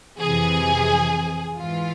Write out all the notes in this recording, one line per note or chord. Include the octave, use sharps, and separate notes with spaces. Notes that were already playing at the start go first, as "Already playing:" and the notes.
F2 C3 E3 G#4
G#2 E3 F4